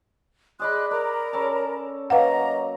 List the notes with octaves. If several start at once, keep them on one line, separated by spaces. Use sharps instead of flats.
G#4 D5 D#5 B5 C6 F#6
A#4 D5 A#5 B5
C#4 A4 A5
F#3 A#3 B4 D#5 F5 F#5 A#5